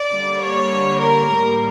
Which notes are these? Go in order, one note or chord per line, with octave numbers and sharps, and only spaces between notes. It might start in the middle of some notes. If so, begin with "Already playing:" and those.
Already playing: D5
D3 G3 A#3
C#5
A#4
A2 G3 A#3